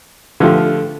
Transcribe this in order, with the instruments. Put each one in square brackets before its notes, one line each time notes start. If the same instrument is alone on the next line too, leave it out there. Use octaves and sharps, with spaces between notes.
[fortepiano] D3 F3 A3 F4 G4